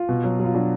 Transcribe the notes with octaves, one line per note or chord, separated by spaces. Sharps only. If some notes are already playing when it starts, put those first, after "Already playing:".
Already playing: F4
B2
F#3
F#3 F4
F#3 D4